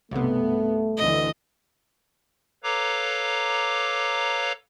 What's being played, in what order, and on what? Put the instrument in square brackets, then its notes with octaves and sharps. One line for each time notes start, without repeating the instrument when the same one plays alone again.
[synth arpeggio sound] B1 C3 [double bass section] G2 B3 [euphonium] A3
[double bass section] D2 D3 E3 [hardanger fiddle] D#5
[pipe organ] A4 B4 C#5 F5 A#5 D6